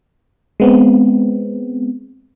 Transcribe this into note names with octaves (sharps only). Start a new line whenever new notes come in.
G#3 B3 C4